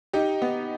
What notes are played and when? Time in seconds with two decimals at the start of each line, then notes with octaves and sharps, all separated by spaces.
0.13 D#4 G4
0.42 B3